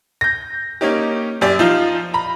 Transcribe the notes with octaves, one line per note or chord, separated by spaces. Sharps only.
G6 A#6
A#3 C#4 D#4 G4
F#2 G4 D5
F3 D#4 F4
A#5 B5